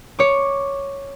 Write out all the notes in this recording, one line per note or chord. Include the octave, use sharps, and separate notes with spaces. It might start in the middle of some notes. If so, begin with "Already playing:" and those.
C#5 D6